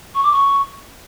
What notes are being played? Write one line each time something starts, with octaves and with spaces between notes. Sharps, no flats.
C#6
D6
C#6